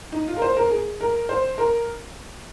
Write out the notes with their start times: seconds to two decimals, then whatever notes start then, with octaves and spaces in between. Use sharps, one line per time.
0.12 D#4
0.28 F4
0.37 A#4
0.42 C5
0.57 A#4
0.70 G#4
1.01 A#4
1.29 C5
1.58 A#4